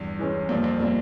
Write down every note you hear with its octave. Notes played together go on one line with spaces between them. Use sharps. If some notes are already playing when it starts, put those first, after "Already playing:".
Already playing: E2 G2
E3 G#3 C#4
F2 A#2 G3 A#3
F2
A#2 G3 A#3